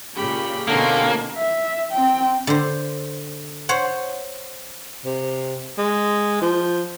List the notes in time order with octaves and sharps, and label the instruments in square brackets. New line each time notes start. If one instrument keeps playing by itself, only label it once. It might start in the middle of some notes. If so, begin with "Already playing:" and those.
[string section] A#2 C#3 [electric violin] G4 B5
[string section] B2 C#4 D#4 [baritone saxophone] D3 [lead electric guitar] A#3 [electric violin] C4 G#4
[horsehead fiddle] E5
C4 G5
[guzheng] D3 C5
C5 C#5 F#5
[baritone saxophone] C3
G#3
F3